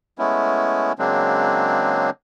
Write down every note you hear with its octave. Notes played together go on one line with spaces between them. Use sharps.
G#3 A3 B3 C#4 E4
C#3 F#3 G#3 A#3 C4 D4